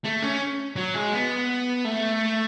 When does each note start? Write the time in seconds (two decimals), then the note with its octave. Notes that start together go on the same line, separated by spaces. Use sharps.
0.04 A3
0.22 C#4
0.76 F#3
0.94 G#3
1.12 B3
1.85 A3